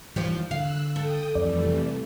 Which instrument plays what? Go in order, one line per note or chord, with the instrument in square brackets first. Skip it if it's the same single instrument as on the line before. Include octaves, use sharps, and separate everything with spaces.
[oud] D#2 F3 G3 [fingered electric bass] E3
[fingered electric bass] D3 [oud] F5 [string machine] E6 F#6
[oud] A4 [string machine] G5 D#6
[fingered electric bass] F2 [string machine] E3 G3 A3 [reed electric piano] D5
[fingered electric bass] C3